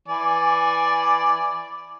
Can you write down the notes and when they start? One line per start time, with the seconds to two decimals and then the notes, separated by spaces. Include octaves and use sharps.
0.08 E3 D5 G#5